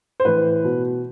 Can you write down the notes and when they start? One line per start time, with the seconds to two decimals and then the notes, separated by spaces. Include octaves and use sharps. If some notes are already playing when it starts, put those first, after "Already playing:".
0.20 C5
0.25 A2 E3 B4
0.64 B2